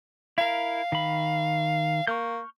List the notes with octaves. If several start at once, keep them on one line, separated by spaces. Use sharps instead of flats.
E4 A#4 F5
D#3 B5
A#3 C#6 F6 G6